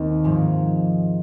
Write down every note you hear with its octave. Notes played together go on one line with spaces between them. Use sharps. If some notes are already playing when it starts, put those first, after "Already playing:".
Already playing: D#2 D#3 C4
G#2 F3 G#3